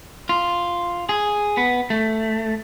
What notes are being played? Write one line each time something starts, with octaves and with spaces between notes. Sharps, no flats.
F4
G#4
B3
A3